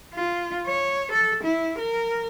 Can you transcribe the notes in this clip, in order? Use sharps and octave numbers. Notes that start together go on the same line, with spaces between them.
F4
C#5
A4
E4
A#4